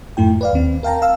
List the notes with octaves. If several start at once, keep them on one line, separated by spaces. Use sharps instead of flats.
F2 G#2 A3 E4 G5
B4 D5 F5
D#2 C4
A#4 F5 G5 A5 A#5
F5 E6